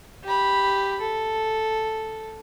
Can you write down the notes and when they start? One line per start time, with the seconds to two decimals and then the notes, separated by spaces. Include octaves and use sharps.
0.24 G4 B5
1.00 A4